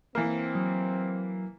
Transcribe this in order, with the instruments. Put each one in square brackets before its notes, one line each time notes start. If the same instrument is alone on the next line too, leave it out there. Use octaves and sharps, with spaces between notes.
[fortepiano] E3 A#3 [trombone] C4
[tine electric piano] F#3